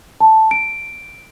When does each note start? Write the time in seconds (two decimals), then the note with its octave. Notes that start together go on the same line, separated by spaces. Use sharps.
0.20 A5
0.51 D7